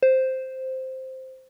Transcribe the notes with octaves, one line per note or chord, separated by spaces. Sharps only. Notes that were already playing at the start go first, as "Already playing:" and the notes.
C5